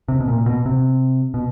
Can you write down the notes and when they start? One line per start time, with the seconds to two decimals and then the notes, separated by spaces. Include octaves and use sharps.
0.08 C3
0.20 B2
0.28 A#2
0.46 B2
0.66 C3
1.34 B2